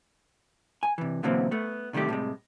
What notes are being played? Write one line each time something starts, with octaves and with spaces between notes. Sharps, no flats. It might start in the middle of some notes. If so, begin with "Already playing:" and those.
G#5
C3 E3
B2 D3 E3 F#3 A#3 C4
A3 B3
C3 D#3 G3 A3 G4
A2 C3 G3 G#3